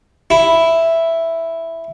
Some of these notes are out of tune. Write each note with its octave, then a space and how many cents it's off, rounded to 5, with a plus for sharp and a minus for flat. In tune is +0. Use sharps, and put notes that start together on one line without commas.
E4 +0